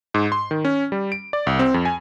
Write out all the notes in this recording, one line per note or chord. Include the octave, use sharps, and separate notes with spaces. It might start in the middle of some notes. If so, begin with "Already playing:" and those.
G#2
C6
D#3
C#4
G3
D7
D5
C2
C4
F2
G#5